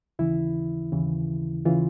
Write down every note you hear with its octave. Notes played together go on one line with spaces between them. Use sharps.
D#2 C#3 E3 E4
D#2 C#3 E3
C#3 E3 F4